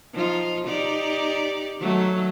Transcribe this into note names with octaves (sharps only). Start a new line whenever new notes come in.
F3 D#4 F4
D#4 G4 D5
D#3 F#3 A3